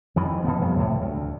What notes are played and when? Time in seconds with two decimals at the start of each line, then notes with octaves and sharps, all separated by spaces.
0.16 F2 D#3 E3
0.44 B2 F3 B3
0.61 F2 G3
0.77 C#2 A2 C3
1.01 D2